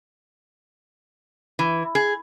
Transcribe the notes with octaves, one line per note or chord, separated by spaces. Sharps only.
E3
G#4